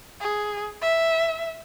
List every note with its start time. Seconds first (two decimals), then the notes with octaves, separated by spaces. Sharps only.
0.20 G#4
0.81 E5